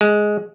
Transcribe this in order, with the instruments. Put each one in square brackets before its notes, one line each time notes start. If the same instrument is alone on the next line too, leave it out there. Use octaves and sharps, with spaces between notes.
[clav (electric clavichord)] G#3